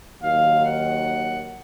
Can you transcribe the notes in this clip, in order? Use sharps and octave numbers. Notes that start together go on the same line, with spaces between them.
D#2 D#3 F#3 F5
F#5